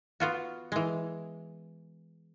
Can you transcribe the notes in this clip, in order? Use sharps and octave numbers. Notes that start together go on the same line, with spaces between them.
B3 F4 F#4
E3 G#3